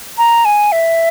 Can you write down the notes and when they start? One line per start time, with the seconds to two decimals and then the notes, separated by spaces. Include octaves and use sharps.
0.18 A#5
0.45 G#5
0.72 E5